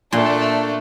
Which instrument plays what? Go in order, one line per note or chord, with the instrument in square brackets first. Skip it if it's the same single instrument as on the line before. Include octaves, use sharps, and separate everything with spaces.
[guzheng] A#2 C6 [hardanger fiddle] A3 D4